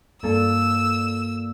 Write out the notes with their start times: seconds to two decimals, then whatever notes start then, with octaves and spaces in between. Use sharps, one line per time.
0.23 G2 A#3 F4 A4 E6